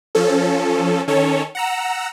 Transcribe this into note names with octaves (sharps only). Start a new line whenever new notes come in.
F3 C#4 A4
D#3 C#4 A4 C#5
F#5 A#5 E6